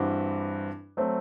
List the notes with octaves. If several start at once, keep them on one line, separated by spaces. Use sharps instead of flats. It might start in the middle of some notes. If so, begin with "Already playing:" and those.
Already playing: G2 E3 G3 C4 F#4
F#3 A3 C4